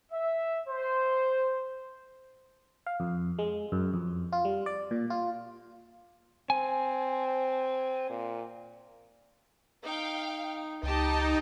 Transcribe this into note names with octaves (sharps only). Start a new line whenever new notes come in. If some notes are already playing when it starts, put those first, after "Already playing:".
E5
C5
F5
F2
G#3
F#2
F2
F4
G3
D5
A#2
F4
C4 G#5
A#2
D#4 F5 G5
C#2 D#4 G4 D#5 G5 A5